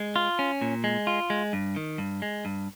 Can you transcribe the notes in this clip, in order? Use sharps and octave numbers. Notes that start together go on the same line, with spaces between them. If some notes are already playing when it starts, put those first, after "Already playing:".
Already playing: G#3
F4
C#4
A#2
G#3
F4
G#3
G2
D#3
G2
G#3
G2